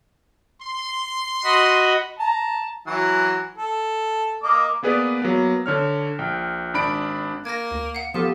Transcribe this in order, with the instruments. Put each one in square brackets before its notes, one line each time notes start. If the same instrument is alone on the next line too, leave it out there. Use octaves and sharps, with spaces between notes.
[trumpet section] C6
[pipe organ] F#4 D#5 B5
[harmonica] A5 A#5
E3 F#3 F#4
A4
A#3 D#5 D6
[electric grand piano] A#3 B3 G#4 B4 D5
F#3 A#3 B3
D3 C#5 F6
A#1 G5
G#1 D4 B5 D7
[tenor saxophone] A#3 [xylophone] G#6 A#6
[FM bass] D2
[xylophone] F5 F#5
[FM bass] F3 [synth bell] B3 G4 A4 [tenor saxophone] F4 [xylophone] F5 E7